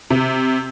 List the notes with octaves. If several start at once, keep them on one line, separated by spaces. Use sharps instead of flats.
C3